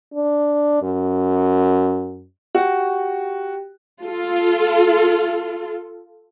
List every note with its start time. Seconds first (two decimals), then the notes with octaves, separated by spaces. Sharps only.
0.14 D4
0.82 F#2
2.55 F#4 G4 G5
4.04 F4 A4